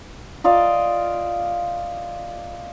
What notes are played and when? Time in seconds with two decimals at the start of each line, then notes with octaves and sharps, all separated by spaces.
0.44 F4 D5 D#5 F5